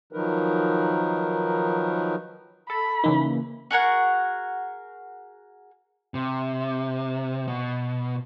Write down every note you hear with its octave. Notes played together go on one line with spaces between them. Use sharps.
D#3 F3 F#3 D#4 A#4 B4
A4 B5
C#3 E3 A#3 D#4
F#4 G#4 A#4 F#5
C3
B2